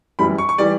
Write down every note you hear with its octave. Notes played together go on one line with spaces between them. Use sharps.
F#2 E3 G3 B5
C#6
C#6
E3 G3 D5